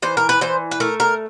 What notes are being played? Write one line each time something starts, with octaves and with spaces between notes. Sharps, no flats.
E3 C5
A#4
B4
E3 C5
B4
A3 A#4
A#4